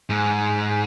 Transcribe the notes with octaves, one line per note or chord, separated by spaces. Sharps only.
G#2